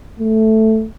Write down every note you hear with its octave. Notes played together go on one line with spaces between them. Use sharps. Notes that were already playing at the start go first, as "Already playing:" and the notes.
A3